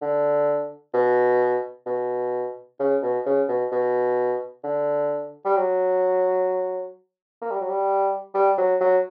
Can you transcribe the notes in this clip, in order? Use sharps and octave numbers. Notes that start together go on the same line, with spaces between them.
D3
B2
B2
C#3
B2
C#3
B2
B2
D3
G3
F#3
A#3
G3
F#3
G3
G3
F#3
F#3